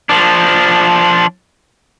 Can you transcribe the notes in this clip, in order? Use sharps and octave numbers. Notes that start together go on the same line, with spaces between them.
F3 D4